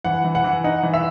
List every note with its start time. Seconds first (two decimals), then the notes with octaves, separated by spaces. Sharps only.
0.05 E3 F#5
0.24 E3
0.35 F#5
0.44 E3
0.64 D#4 F#5
0.83 E3
0.94 E5